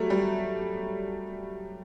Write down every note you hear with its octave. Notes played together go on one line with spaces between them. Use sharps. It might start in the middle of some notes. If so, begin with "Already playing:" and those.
Already playing: F#3 G3 A3
G3